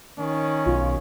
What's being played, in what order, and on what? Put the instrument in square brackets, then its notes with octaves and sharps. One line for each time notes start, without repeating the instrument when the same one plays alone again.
[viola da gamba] D#3 [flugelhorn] C#4
[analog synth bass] B1 [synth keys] F4